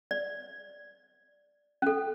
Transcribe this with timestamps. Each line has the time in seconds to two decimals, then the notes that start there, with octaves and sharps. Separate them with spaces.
0.11 D5
1.82 C#4 A4